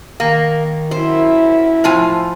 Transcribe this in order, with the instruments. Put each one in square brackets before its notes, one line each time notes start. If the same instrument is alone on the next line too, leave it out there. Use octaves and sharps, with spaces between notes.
[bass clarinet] D#3 [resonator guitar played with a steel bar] A#3
[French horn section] F#2 E4 [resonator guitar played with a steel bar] C5
[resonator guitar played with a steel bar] A2 F4 G#5 [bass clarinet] F3